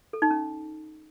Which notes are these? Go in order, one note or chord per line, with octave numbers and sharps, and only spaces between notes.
A4
D#4
C#4